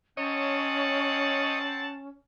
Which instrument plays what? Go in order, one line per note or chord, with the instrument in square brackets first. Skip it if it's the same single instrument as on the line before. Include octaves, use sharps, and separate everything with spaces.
[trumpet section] C4 F#5 A5 [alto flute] C#4 [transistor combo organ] C#5 D#5